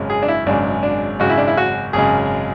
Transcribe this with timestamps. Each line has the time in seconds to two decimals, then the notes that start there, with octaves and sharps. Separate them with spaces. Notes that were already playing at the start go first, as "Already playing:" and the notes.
Already playing: G#1 F#2 C#3 G#3
0.10 G#4
0.23 D4
0.28 E4
0.46 G#1 F#2 C#3 G#3 D4
0.83 D4
1.19 G#1 F#2 C#3 G#3 F#4
1.30 E4
1.38 D4
1.47 E4
1.57 F#4
1.93 G#1 F#2 C#3 G#3 G#4